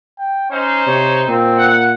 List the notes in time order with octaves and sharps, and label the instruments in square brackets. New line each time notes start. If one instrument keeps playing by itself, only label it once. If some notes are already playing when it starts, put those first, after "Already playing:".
[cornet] G5
[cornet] C#4 [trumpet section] D#4 C5
[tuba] C3 [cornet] C#5
[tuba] A#2 [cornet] C4
[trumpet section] F#5